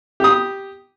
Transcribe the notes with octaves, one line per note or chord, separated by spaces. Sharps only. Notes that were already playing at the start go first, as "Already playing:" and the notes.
G4 D#6